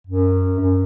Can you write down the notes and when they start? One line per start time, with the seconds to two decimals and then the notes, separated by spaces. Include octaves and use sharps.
0.07 F#2
0.60 F#2